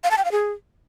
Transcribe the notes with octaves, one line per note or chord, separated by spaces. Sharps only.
F5
A5
G5
F5
G#4